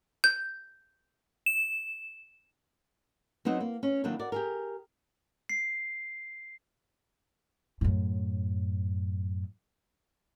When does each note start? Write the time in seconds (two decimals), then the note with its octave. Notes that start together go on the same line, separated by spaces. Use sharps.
0.24 G6
1.46 E7
3.45 F#3 B3 C4 D#4 F#4
3.60 A#3
3.83 C#4
4.04 D#3 F#3 A#3 C4 D4 E4
4.19 F#4 A#4 D5
4.32 G4 G#4 A#4
5.49 C7
7.81 F#2 A2